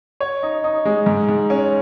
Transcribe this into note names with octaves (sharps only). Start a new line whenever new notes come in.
C#5
D#4
D#4
G#3
G#2
G#2
C#4